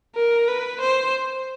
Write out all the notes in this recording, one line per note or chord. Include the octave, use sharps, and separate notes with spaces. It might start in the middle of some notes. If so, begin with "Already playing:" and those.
A#4
B4
C5